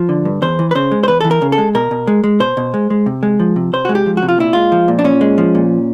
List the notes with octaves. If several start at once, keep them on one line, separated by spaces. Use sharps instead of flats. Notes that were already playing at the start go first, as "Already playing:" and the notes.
Already playing: F3
D3
G2
E2 C5
E3
B4
C#3 C5
G#3
C5
E2 B4
E3 A4
A#4
C#3
A4
G#3
B2 A#4
B2
G#3
G#3
B2 C5
B2
G#3
G#3
C3
G#3
F3
C3
C3 C5
G#3 F#4
G4
F3
F#4
C3
F4
A#2 E4
G#3 F4
F3
A#2
D4
A#2 C#4
G#3
F3
A#2